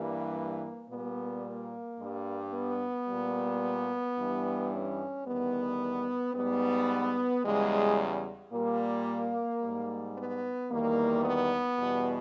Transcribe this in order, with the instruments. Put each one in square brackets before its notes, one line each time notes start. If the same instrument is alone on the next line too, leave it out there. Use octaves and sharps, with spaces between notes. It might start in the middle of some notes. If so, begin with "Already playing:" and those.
Already playing: [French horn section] G2 E3 G3 A#3
A#2 G3 B3
A#3
G2 G3
B3
A#2 G3
G2 E3 G3
C#4
E2 D#3 G3 B3
G#2 G3 B3
E2 C#3 G3 G#3
A#2 G3 A#3
G#2 G3
B3
E2 D#3 G3 A#3
B3
E2 B2 G3